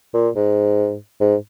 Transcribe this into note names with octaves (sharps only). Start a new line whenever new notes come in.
A#2
G#2
G#2